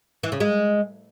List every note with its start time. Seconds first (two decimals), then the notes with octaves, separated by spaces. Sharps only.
0.23 E3
0.32 C#3
0.40 G#3